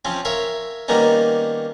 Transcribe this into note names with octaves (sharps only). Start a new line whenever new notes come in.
F3 C4 C#4
A#4 C#5 E5 F5
D#3 G3 A#3 B3 C#4 D#4